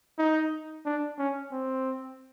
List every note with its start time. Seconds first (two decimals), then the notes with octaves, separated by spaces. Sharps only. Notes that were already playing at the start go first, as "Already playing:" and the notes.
0.19 D#4
0.86 D4
1.19 C#4
1.52 C4